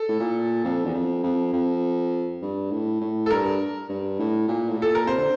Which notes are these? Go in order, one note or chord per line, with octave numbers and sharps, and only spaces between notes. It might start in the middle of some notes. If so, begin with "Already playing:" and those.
Already playing: A4
A2
A#2
F2
E2
F2
F2
F2
G2
A2
A2
A4
G2 A#4
G2
A2
A#2
A2
A#2 A4
A#4
C3 C5
D3